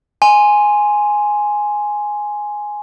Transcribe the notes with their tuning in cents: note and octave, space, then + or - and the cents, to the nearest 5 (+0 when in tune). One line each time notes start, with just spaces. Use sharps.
G#5 +0 C6 +0